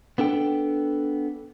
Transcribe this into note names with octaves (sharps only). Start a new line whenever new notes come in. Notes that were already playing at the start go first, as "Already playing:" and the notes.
B3 D4 A4 G5